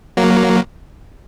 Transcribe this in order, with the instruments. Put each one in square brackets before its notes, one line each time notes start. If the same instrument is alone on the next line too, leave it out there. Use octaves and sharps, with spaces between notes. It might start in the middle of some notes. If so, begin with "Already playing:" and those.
[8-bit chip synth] F#3 A#3